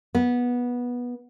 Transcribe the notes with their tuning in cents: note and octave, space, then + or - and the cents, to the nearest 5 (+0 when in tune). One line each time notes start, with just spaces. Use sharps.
B3 -15